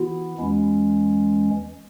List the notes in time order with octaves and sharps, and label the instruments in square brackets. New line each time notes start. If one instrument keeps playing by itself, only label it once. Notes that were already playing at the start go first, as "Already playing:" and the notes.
Already playing: [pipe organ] E3 B3 E4 [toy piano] F#4
[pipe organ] E2 E3 G#3 C#4